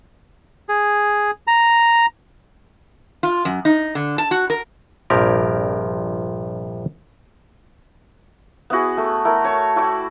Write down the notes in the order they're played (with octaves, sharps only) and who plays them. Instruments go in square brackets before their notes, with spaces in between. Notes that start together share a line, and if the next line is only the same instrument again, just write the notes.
[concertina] G#4
A#5
[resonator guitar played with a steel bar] F4
F#2
D#4
D3
A5
F#4
A#4
[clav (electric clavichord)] A#1 G2 C3 F3 G4 A#4
[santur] B3 E4 F#4 G#4
A3
A3 E4 A#4
C#5 A5
E4 F#4 D5 G5